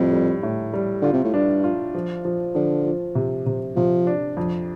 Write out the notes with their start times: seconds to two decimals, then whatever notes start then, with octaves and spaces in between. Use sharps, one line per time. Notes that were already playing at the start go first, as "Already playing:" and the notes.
Already playing: F2 A2 G3
0.12 G3
0.43 A2
0.74 G3
1.02 D3 F4
1.13 C3
1.24 A2
1.34 G2 D4
1.64 F4
1.94 F3
2.25 F3
2.55 D3 F3
2.86 F3
3.15 C3
3.46 C3
3.76 C3 F3
4.07 D4
4.37 F2